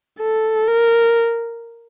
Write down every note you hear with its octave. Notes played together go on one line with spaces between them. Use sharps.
A4
A#4